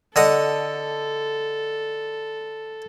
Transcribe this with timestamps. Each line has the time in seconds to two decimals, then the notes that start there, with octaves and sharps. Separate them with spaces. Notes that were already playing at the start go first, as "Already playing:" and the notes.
0.16 D3 A4 D#5 F#5